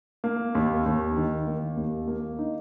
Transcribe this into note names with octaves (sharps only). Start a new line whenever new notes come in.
A#3
D#2
D#2
D#3
A#3
D#2
A#3
D#4